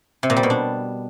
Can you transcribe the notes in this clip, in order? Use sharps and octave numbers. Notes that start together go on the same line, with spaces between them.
C3
A#2
G3
B2
D4